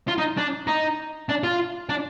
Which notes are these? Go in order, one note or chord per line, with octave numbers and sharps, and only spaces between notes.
F4
D#4
D4
D#4
D4
F4
D4